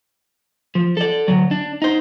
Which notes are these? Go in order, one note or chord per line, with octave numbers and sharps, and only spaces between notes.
F3
A4 D5
D3 F#3
D4
D#4 C5